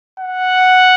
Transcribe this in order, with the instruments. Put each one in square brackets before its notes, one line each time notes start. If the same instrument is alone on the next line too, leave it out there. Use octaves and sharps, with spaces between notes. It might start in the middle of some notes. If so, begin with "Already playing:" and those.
[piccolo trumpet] F#5